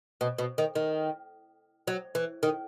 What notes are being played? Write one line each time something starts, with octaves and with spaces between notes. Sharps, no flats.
B2
B2
D#3
D#3
F#3
E3
D#3